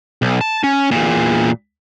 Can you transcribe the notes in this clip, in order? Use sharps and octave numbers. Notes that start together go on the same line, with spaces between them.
B1
A5
C#4
E2 A#2